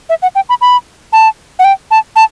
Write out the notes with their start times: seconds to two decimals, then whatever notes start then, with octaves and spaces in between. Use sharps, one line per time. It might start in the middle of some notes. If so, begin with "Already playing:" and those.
0.09 E5
0.22 F#5
0.35 G5
0.49 B5
0.61 B5
1.13 A5
1.59 F#5
1.64 G5
1.91 A5
2.16 A5